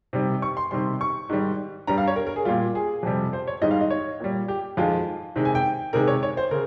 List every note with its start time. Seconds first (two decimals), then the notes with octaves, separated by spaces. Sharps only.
0.13 C3 D#3 G3
0.42 C#6
0.57 C6
0.71 C3 D#3 G3 C6
1.01 C#6
1.29 G#2 D#3 G3
1.87 G2 G3 A#5
1.98 F5
2.08 C#5
2.16 A#4
2.27 A#4
2.36 G#4
2.45 A#2 G3 F4
2.75 G#4
3.03 F2 C3 G3
3.33 C5
3.47 C#5
3.62 G#2 D#3 G3 D#5
3.71 F5
3.81 D#5
3.90 C#5
4.20 A#2 G3
4.48 G4
4.77 F2 D#3 G#3 F4
5.36 C3 D#3 G#3
5.45 G#5
5.55 G5
5.93 C3 D#3 G#3 A#4
6.08 C#5
6.23 C#5
6.37 C5
6.51 C#3 A#4